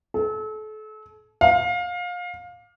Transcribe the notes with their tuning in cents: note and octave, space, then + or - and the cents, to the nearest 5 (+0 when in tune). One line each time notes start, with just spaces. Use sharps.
A4 -35
F5 +25